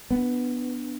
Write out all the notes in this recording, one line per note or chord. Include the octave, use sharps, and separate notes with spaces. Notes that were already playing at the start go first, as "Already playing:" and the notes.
B3 D4